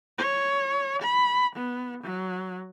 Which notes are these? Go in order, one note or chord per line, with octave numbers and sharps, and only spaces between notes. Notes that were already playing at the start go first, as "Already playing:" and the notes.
C#5
B5
B3
F#3